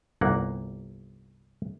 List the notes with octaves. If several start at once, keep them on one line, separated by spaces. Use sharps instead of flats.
G1 C2 A#3 F#5